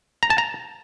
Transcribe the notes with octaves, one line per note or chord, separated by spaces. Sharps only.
A#5
A5
A#5